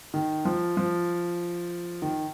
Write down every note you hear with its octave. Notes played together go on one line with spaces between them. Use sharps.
D#3
F3
F3
D#3